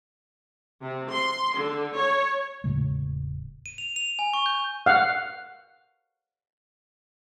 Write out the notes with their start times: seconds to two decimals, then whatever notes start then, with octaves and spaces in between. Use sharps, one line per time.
0.82 C3
1.11 C6
1.57 D3
1.96 C#5
2.64 E1 A2 C#3 G#3
3.66 D#7
3.78 F7
3.96 F7
4.19 G#5
4.34 C#6
4.46 G6
4.86 F5 F#5